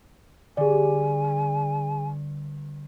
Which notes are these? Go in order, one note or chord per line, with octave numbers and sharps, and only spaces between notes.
G2 D3 G#4 D5 G#5